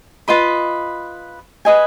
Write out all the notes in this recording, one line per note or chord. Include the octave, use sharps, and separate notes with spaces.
F4 B4 D#5 B5
B4 D#5 G#5